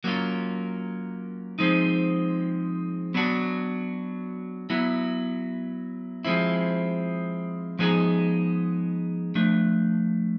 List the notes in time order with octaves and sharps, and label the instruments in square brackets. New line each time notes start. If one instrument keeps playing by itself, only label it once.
[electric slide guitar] F#3 A#3 C#4 F4
F3 G#3 C4 D#4
F#3 B3 D4 F#4
F#3 B3 E4
F3 G#3 C4 E4
F3 G#3 B3 D#4 G#4
F3 A3 D4